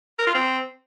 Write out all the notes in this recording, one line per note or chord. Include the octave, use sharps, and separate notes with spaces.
A#4
F4
C4